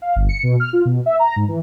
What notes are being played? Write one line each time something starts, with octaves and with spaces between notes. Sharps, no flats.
F5
G1
C#7
B2
F6
F4
B2
E5
A#5
G#2
E3